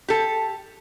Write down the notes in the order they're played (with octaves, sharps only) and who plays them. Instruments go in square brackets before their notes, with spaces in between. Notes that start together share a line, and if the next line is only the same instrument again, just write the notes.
[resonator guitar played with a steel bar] G4 A4